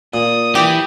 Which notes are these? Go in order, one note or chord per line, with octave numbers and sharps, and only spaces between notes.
A#2 D#6
E3 E4 G4